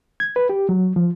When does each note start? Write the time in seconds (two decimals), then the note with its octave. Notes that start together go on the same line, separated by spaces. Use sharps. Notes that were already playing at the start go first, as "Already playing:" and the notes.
0.20 G#6
0.36 B4
0.49 G4
0.69 F#3
0.96 F3